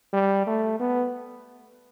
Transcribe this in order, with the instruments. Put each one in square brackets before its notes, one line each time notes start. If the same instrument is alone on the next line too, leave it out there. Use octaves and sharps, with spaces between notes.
[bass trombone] G3
A3
B3